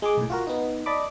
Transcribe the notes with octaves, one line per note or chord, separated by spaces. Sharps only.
G#3 G#4 D6
B1 A2
F4 F#4 A#4
B3 D#4
D5 D#5 A5 B5 D6